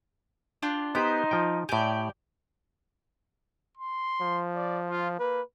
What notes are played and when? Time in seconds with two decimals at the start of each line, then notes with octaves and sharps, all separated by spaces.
0.62 D4 F4 G4
0.95 B3 D#4 G4 B4 C5
1.31 F3 G5
1.69 A2 G4 D5 G#5
3.77 C6
4.21 F3
4.56 D5
4.90 F4
5.19 A#3 B4